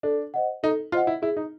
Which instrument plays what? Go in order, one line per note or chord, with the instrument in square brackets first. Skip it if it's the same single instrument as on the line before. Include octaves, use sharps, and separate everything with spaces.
[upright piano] D4 [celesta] A4
[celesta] C5 D#5 F#5
[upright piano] D#4 [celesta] A4
[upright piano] F4 [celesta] C5 D#5 F#5
[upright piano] E4
[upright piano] E4 [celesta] G#4
[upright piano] D#4